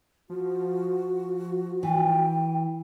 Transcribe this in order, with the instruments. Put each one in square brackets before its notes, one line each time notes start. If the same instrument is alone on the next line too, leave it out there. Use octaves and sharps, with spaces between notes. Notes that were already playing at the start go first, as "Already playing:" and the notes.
[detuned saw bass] F3 [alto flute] F#4
[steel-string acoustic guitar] E3 [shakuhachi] G5